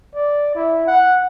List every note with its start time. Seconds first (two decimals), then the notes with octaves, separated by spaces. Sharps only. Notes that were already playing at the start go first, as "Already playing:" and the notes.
0.15 D5
0.55 E4
0.87 F#5